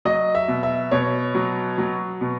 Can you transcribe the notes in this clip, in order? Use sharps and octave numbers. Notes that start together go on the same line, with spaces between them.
F#3 D#5
E5
B2
E5
B2 C#5
F#3
F#3
B2